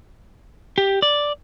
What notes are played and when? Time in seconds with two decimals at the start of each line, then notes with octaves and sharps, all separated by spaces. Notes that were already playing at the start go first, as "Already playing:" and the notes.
0.78 G4
1.02 D5